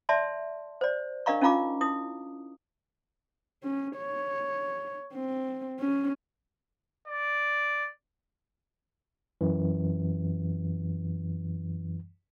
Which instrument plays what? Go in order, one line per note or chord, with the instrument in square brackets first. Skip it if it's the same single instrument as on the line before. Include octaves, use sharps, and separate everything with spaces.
[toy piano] D5 E5 A5 C6
C5 D5
D4 A#4 D#5 F5 A#5 C#6
C#4 D#4 F4 F5 A#5 D6
E4 D#6
[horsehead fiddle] C#4
C#5
C4
C#4
[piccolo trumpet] D5
[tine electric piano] F#2 E3